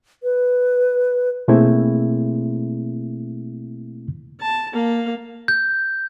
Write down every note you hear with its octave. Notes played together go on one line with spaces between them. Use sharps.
B4
B2 A3 A#3 C4 E4 G#4
A5
A#3 F5
G6